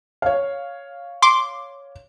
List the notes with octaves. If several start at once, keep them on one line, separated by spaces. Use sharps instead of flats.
C#5 F5
C6 D6